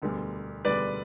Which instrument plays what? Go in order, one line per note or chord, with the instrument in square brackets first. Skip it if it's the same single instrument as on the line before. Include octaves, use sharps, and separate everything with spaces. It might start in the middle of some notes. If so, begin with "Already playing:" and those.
[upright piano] E1 D2 D3 G3 B3
[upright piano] E1 D2 D3 G3 B3 [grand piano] B4 D5